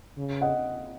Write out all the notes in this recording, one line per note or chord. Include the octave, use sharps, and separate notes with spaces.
C#3
D#5 F#5